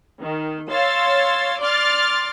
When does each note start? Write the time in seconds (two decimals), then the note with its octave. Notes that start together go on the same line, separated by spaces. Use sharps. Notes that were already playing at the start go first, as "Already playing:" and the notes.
0.21 D#3
0.70 C#5 F5 C6 E6 A6
1.60 D5 C6 D6 F6 A6